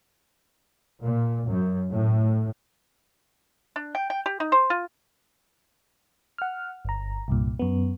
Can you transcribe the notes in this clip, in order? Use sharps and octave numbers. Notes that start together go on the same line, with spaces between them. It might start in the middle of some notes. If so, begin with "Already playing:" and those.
A#2
F#2
A2
D4
G5
G5
G4
D#4
C5
F4
F#5 F6
G1 A#5
C2 G2 A#2
F#2 B3